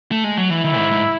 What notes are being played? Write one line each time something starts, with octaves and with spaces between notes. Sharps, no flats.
A3
G#3
F#3
E3 E4
D#3
G#2
G#2